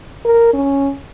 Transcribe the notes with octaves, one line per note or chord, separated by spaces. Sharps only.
A#4
C#4